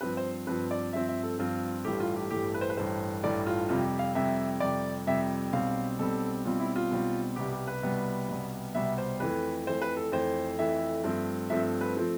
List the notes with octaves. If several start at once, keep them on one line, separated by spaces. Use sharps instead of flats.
G2 F3 C4 B4
C5
G2 F3 C4 B4
D5
G2 F3 C4 E5
E5
A4
G2 F3 C4 F4
A1 G2 E3 A3 G4
F4
G4
A1 G2 E3 A3 G4
B4
C5
B4
A1 G2 E3 A3 C5
A1 G2 E3 A3 D5
F4
F2 C3 G3 F4
G4
F5
F2 C3 G3 E5
F2 C3 G3 D5
F2 C3 G3 E5
B1 B2 G3 C4 F5
B1 B2 G3 C4 A4
B1 B2 G3 C4 F4
E4
F4
B1 B2 G3 C4
C2 B2 G3 B3 G4
G4
B4
C2 B2 G3 B3
C2 B2 G3 B3
C2 B2 G3 B3 E5
C5
F2 E3 A3 B4
F2 E3 A3 C5
B4
A4
F2 E3 A3 C5
F2 E3 A3 E5
G2 F3 A3 C4
G2 F3 A3 C4 E5
B4
F3 A3 C4